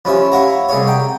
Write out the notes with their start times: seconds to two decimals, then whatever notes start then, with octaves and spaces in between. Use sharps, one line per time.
0.05 F3 C#4 G4 C#5 E5 B5
0.32 E4 C#5 F5 F#5 A#5
0.69 C2 G#4 C#5
0.87 F#5 G5 A#5